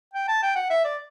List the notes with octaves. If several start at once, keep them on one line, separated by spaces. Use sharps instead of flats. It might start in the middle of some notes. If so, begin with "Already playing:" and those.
G5
A5
G5
F#5
E5
D5